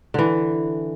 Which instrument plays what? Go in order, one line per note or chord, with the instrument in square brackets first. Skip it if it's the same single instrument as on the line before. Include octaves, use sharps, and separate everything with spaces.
[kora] D3 E3